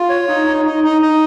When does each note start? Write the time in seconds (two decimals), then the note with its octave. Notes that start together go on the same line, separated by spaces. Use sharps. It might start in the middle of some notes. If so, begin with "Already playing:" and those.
Already playing: F4
0.09 C#5
0.28 D#4
0.47 D#4
0.65 D#4
0.84 D#4
1.02 D#4